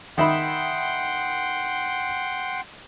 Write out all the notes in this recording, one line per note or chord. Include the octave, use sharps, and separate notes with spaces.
D#3 E5 F#5 G5 B5 C6